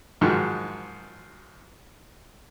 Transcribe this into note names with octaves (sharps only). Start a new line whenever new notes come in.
G#2 D#3 F3 F#3